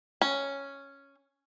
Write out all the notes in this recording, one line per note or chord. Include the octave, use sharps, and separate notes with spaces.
C#4